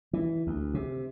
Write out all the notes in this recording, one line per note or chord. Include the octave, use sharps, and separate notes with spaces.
E3
D2
C3